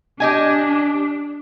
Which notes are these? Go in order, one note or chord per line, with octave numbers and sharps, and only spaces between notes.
D4 G4 D#5 G#5